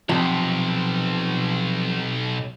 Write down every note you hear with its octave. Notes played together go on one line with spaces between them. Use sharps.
B1 C3 F3